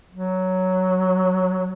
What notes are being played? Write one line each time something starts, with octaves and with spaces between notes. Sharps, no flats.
F#3